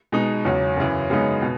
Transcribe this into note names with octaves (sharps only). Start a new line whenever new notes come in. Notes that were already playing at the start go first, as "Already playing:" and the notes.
B2 G#3 D#4
E2 C#3 F#3
F#2 C#3 E3
F#2 C#3 G#3 B3 D#4
B2